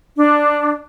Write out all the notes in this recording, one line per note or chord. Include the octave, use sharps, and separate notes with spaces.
D4